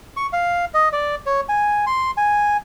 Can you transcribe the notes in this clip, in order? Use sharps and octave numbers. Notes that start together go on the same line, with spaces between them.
C#6
F5
D#5
D5
C#5
G#5
C6
G#5